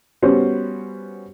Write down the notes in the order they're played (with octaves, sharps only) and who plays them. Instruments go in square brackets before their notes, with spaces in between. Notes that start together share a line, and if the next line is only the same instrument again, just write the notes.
[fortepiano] G3 B3 C#4 F#4 C5